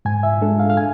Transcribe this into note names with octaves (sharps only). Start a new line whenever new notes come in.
G#2 G#5
E5
G#3 D4 A4
F5
F5
G#5